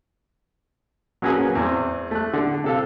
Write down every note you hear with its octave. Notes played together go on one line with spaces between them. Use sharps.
F#3 A#3 C#4 F#4 G#4 B4
E2 C4
A3 F#6
D3
C3 A4 F5